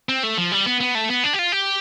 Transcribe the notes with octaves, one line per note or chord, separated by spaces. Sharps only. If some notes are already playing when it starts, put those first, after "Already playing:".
C4
A3
F3
G3
B3
B3
A3
B3
D4
G4
F4
G4